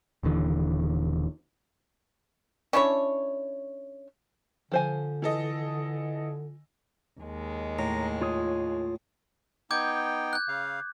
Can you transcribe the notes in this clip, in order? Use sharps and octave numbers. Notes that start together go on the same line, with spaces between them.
D#1 D#2 D3 E3
C#4 D4 E4 C#5
D3 F3 C5 G#5
E3 A4 D#5
D#2 G#3
A2 A#5
F4 C#5 D#6
B3 D#4 G5 D6 G6 G#6
F#6 G6
C#3 F5